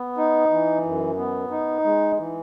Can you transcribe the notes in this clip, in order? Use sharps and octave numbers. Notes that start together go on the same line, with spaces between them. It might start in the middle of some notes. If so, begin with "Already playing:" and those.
Already playing: B3
D#4
E3
F#2
B3
D#4
G#3
E3